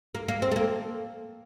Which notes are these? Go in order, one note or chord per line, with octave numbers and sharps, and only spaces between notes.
A#3
A#3
C4
A3
A#3